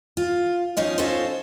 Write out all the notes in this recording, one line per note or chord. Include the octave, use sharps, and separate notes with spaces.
F4
F3 C#4 D#4 D#5
C#4 D#4 F4 F#4 A4 C5